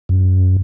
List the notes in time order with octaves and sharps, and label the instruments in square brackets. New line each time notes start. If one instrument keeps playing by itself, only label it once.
[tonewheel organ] F#2